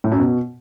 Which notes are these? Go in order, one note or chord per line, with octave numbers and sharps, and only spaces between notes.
A2
F#2
B2